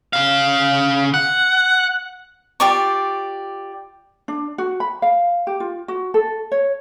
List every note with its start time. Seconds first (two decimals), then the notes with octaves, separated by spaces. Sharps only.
0.13 C#3 F5
1.14 F#5
2.60 F4 G4 D5 C#6
4.28 D4
4.58 F#4
4.80 B5
5.02 F5
5.47 G4
5.60 F4
5.88 F#4
6.14 A4
6.52 C#5